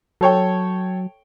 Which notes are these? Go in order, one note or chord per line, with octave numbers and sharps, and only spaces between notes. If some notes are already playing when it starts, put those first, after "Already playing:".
F#3 A4 C#5 G5